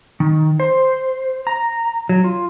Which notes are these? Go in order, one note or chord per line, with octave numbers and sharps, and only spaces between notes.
D#3
C5
A#5
F#3
F4